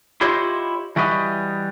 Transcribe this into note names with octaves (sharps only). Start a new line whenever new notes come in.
E4 F4 G4 C5 C#5 D#5
E3 G3 F#4 B4 D#5